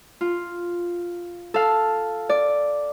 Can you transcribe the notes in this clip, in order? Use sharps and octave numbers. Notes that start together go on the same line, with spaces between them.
F4
A4 F5
D5